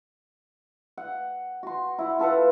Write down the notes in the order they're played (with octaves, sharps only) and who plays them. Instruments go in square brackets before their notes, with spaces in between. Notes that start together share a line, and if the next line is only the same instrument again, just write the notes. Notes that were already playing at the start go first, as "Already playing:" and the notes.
[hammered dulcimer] F#5
F#4 C6
E4 F#5
F4 A4 B4 F#5